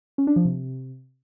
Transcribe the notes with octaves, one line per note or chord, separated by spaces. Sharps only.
C#4
D4
F3
C3